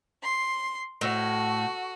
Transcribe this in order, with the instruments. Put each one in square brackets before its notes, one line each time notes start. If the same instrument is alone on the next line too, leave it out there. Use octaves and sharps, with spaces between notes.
[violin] C6 C7
[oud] A2 [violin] F#4